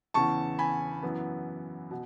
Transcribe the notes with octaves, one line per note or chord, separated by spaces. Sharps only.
E2 C#3 E3 A5 C#6
G#5 B5
F#2 E3 B3
B2